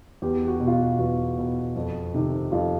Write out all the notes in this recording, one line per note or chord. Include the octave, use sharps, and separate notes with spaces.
E2 G4
F#4
B2
F4
F#4
E2 F#4
B2
F2
C3 D#3
F2 F4